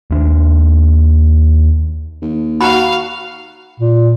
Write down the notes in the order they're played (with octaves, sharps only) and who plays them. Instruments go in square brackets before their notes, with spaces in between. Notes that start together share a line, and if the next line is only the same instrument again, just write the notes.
[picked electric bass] D#2 D4
[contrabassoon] D#2
[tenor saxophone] F#4 [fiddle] F5 [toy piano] A#5 B5
[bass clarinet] A#2